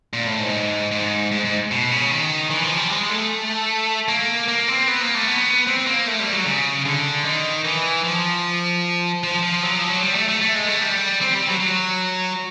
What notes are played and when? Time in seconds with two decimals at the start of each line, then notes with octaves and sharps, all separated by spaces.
0.13 A#2
0.26 A2
0.40 G#2
0.92 G#2
1.32 G#2
1.45 G#2
1.71 B2
1.91 C#3
2.11 D#3
2.50 E3
2.64 F3
2.77 G3
2.90 G#3
3.09 A3
4.09 A#3
4.48 A#3
4.68 C4
4.88 B3
5.01 A#3
5.15 A3
5.28 B3
5.67 C4
5.87 A#3
6.07 A3
6.20 G3
6.33 F#3
6.46 C#3
6.86 D3
7.25 D#3
7.65 E3
8.04 F3
9.24 F3
9.43 F3
9.63 F#3
9.75 F3
9.89 F#3
10.02 G3
10.15 A3
10.28 A3
10.42 A3
10.55 G#3
10.68 A3
10.81 G3
11.21 C4
11.34 G3
11.47 F#3
11.60 F#3